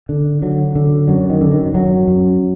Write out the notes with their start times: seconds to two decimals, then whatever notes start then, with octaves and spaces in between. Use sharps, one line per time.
0.09 D3
0.42 D3 F#3
0.75 D3
1.08 F#2 F#3
1.30 D#3
1.41 F#2 D3
1.51 D#3
1.74 F#2 F#3
2.08 F#2